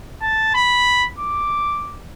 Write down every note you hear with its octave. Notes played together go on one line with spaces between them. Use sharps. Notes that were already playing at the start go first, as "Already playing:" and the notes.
A5
B5
D6